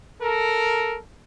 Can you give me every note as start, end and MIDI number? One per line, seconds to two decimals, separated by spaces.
0.22 0.97 69
0.22 0.97 70